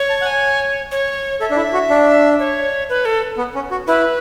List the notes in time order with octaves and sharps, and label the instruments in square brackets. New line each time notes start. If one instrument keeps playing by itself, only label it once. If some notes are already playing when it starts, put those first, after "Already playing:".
Already playing: [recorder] C#5
[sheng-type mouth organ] A5
F#5
G#5
[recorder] C#5
[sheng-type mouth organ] A4 [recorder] E5
[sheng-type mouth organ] D4
E4
F#4
D4
[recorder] C#5
B4
A4
[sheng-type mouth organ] B3
C#4
F#4
[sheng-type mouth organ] E4 [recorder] B4